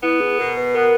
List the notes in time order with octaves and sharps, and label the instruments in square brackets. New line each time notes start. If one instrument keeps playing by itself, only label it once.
[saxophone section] B3 [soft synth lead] E4
[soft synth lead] G#4
[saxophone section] B2 [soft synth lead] A#4
[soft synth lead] B4
[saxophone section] B3 [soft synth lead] A#4